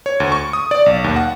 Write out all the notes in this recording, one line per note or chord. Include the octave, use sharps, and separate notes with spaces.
C#5
D2
C#6
D#6
D5
B1
D#2
F#5